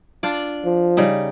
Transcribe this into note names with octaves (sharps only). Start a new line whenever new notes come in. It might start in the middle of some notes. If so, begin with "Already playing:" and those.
D4 F4 D5
F3
C#3 G3 D#4